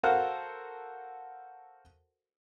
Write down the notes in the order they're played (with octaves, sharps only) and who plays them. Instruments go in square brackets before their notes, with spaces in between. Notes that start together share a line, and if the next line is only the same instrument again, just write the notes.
[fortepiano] F#4 A4 A#4 C5 F5 F#5